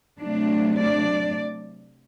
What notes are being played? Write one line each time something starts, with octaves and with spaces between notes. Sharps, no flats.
C3 F#3 A3 D4
D4 D5